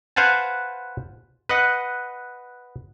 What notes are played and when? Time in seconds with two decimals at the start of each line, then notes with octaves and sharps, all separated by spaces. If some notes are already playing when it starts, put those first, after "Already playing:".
0.16 B4 C5 F5 F#5 G#5 A5
1.49 B4 D#5 F#5